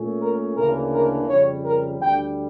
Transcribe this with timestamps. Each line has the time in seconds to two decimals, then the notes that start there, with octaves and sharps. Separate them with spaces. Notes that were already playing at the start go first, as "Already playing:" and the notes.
Already playing: A#2 A3 C#4
0.21 A#4
0.57 D2 C#3 E3 A#3 D4 A#4
0.92 A#4
1.28 F2 C#3 G3 C#5
1.64 A#4
2.00 D2 D3 G3 G5